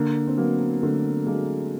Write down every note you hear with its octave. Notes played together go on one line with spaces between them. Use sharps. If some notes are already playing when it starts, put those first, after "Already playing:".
Already playing: D3 A#3
C4
F#3 A#3 B3
D3 A3
F#3 G#3 A#3